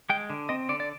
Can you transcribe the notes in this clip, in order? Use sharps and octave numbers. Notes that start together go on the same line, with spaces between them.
G#3 G5
D3
C4 D#5
D3 D5
D5